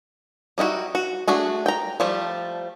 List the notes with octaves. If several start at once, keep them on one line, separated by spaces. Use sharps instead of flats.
G3 D#4 E4 F#4
F#4
A3 D4 F#4 G#4
G5 A#5
F3 G3 A3